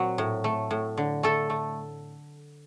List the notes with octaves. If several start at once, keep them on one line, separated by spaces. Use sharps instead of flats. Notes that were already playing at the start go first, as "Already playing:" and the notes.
Already playing: A#2 F#3 C4 F#4
A2
A3
A2
D3
A3 A4
A3